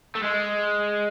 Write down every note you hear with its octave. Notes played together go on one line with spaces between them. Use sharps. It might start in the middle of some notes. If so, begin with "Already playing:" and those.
A3
G#3